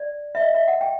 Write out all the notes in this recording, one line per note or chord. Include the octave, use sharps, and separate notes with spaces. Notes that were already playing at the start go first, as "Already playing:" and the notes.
Already playing: D5
E5
D#5
E5
F#5
G5